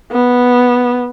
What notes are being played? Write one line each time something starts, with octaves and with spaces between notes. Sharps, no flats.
B3